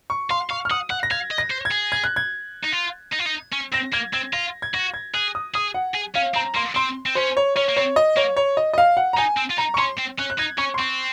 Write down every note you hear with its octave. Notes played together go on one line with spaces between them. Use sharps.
C#6
F5 C6
F5 C#6
F6
F#5 D#6
F#5 F#6
A#6
F5 G#6
D#5
A#6
C5
G#6
G#4
G#6
F#6
G#6
D#4
F4
D#4
F4
D#4
C#4
C4 A#6
A#3 G#6
C4 G#6
F4 A#6
G#6
F#4 A#6
G#6
G#4 F#6
D#6
G#4 D#6
F#5
G#4
C#4 F5
C4 A#5
A#3 C6
C4 C6
C4
C#4 C5
C#5
C#4 C#5
A#3
C4 C#5
D#5
A#3 C#5
C#5
D#5
D#5
F5
F#5
A#5
D#4 G#5
C4
F4
D#4 A#5
C#6
C#4 C6
C4
C#4 F#6
F#6
D#4 G#6
C#4 C#6
C6
C4 C#6